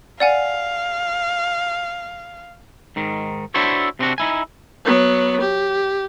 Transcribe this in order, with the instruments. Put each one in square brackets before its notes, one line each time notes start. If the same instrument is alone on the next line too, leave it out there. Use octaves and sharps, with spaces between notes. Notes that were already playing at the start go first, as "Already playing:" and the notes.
[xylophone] D5 F#5 G#5 [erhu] F5
[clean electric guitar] G#2 D#3
D4 E4 F#4 A4 C5 C#5
C3 B3 C4 D4 F#4
D#4 E4 G#5
[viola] F#3 B3
G4